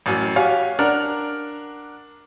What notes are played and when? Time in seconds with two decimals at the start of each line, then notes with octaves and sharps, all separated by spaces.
0.06 A1 F#2
0.36 F#4 G4 C#5 F5 G#5
0.79 D4 A#4 F#5 F6 F7